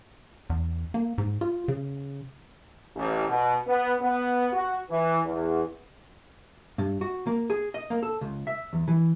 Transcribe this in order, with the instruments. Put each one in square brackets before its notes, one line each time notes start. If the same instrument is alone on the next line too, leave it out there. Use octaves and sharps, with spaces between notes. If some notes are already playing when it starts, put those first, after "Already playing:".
[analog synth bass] E2
A#3
G#2
F4
C#3
[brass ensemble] A1
B2
B3
B3
F#4
E3
E2
[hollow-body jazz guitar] G2
F#4
A#3
G#4
D#5
A#3
A4
C#2
E5
E2
E3